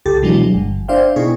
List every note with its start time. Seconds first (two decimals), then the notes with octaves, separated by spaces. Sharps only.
0.06 C#2 G4 A4 A6
0.23 B2 E3 F#3 G#3 D4
0.54 G1
0.88 D4 C5 D5 E5 F5 G5
1.16 B2 D#4 E4 G#4 G#5 C#6